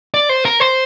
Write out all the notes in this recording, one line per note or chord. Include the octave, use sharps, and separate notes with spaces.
D5
C5
A#4
C5